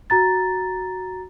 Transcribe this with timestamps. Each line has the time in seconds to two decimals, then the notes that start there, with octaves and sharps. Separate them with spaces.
0.10 F#4 A#5 A6